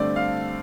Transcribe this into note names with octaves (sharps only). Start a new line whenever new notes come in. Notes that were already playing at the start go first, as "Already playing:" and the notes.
Already playing: G2 D3 A3 C4 D5
F5